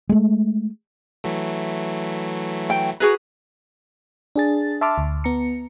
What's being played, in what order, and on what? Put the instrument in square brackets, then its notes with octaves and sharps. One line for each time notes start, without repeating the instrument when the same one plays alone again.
[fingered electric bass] G#3 A3
[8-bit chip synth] E3 F#3 A3
[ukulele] G5
[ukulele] F#4 G#4 B4 [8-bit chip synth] A#5 B5
[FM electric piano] D4 G#4 A6
E5 A5 C6 D6 F6
D2
B3 A#5 C#7